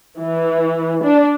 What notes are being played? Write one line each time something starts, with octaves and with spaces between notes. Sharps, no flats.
E3
D4